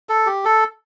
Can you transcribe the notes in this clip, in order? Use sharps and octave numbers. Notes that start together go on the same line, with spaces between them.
A4
G4
A4